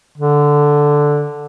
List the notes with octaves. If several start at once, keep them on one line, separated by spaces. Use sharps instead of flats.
D3